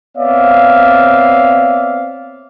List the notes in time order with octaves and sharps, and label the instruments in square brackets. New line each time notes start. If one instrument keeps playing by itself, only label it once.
[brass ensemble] B3 C4 C#5 D5 E5 F5